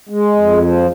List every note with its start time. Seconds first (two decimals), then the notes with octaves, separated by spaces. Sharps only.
0.09 G#3
0.35 F2
0.61 F3